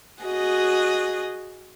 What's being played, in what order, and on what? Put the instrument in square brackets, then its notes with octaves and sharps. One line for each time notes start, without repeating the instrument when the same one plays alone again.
[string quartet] F#4 G#4 D#5